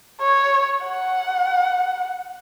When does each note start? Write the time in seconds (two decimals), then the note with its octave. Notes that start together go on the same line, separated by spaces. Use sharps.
0.22 C#5
0.85 F#5